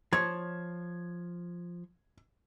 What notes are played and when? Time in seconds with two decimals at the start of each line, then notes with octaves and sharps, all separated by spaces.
0.13 F3 C#5 G#6